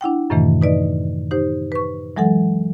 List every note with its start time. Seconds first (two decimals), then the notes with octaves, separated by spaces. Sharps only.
0.01 D4 E4 F#5 G5
0.30 F#2 A2 C3 D#3 E3 A3
0.61 D#4 B4 D5 D#5
1.31 D#4 G4 C5
1.72 B4 C#6
2.16 E3 F#3 G#3 A4 F#5